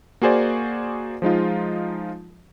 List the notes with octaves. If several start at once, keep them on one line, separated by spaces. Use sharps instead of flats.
A#3 F#4 G#4 C5 D5
F3 G#3 D#4 F4